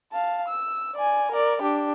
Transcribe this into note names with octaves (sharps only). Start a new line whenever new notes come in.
F5 A5
E6
D5 G#5
A#4 D5
D4 G4